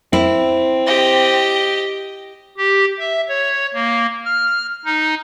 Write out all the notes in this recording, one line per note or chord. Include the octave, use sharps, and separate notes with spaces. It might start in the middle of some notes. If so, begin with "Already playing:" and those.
C4 E4
G4 D#5
G4
E5
C#5
A#3
F6
D#4